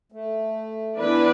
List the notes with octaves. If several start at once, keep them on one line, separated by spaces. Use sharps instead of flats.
A3
E3 B3 D4 B4 D5